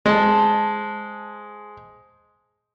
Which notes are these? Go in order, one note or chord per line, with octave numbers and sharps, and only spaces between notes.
G#3 C5 A5